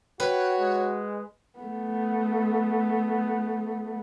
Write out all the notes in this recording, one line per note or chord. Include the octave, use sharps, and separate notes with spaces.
F#4 B4 C#5 G5
G#3
A3 B3